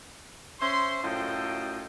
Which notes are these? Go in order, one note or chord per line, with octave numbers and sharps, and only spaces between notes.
C#4 C5 E5 C6
F#2 A2 F4 A4 D#5 G5